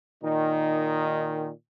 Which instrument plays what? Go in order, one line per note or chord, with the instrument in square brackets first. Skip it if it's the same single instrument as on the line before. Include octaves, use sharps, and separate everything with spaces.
[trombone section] A#2 D#3 [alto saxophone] D#4